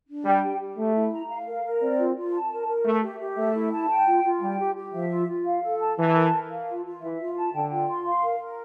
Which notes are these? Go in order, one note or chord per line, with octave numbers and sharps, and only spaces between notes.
D4
G3 G5
G4
G4
A3 E5
E4
A#5
F5
A#4
A#4
C4 D5
F4
F4
A5
A#4
A#4
A3 E5
G4
G4
A3 E5
E4
A5
G5
F4
F4
G3 G5
G4
G4
F3 E5
F4
F4
F5
A4
A5
E3 A5
A#4
A#4
F5
F4
F4
E3 E5
F4
A5
D3 G5
F4
C6
F5
A#4
A#4